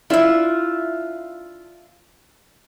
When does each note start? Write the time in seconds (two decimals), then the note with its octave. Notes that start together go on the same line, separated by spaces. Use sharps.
0.10 D4 E4 F4 E5